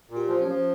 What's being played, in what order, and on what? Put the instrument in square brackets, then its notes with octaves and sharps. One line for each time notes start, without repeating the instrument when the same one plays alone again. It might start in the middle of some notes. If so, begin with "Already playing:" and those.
[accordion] A#2
[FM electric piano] G4
[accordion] F3
[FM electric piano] C#4
[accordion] F3